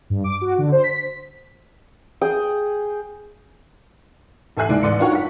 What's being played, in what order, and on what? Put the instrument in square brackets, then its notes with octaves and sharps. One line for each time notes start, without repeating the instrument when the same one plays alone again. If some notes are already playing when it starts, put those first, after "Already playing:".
[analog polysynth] G2
D6
F#4
D3
C5
B6
[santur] G#4 G5 D#6
[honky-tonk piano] A1 A4 E5 G#5 F#6 C7
G1 D#2 G#3 E4 D5 D7
A1 D5 C6 C#7
D4 F4 F#4 A#4 C#5 F#5
G2 F#5 B6